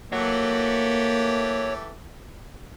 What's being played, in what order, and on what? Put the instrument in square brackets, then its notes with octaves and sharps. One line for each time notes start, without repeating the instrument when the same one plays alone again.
[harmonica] E3 A3 G4 [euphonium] A#3 [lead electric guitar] C#5 F#5